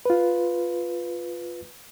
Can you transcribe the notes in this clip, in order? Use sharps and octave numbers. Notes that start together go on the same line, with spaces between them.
F4 B4